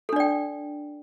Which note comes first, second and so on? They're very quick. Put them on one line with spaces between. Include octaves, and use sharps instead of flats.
A4 D4 D5 G5